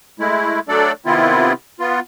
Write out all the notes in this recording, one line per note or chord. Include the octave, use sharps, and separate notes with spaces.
G#3 A3 E4
F#3 A3 D4 A4 D5
C3 D#3 B3 C4 E4 F4
B3 F4